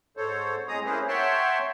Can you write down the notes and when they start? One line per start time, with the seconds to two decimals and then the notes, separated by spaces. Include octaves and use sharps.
0.17 G#2 A4 C5 C#5
0.68 A2 G#3 C4 G#4 A#5 D#6
0.84 A#3 C#4 E4 G#4 B4 C5
1.08 C#5 E5 F#5 G5 A5 C6